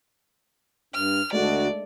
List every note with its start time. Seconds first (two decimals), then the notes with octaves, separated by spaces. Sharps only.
0.94 G2 F6
1.33 D2 G#3 A3 D4 F#4 D5